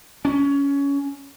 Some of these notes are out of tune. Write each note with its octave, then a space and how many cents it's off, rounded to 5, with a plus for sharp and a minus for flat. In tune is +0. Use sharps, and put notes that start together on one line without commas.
C#4 +20